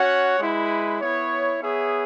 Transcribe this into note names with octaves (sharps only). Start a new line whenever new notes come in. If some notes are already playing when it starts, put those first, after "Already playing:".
Already playing: C#4 F#4 C#5 F#5
G#3 E4 B4
B3 E4 C#5
B3 G#4 C#5 E5